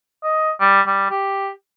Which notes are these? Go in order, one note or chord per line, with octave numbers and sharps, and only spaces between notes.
D#5
G3
G3
G4